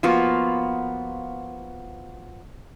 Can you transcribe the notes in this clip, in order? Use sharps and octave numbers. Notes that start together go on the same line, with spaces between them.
F3 A#3 B3 F4 F#4